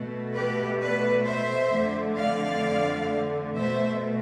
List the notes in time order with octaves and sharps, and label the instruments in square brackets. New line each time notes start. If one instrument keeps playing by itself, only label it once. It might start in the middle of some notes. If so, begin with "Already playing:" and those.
Already playing: [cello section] B2 A3
G4 B4
B4 D5
C5 E5
F2 D3 A3
D5 F5
B2 A3 C5 E5